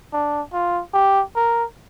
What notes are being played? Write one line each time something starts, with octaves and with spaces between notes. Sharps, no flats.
D4
F4
G4
A#4